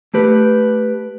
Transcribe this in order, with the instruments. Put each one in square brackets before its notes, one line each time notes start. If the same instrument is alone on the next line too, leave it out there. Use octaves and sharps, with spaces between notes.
[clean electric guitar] A3 G4 B4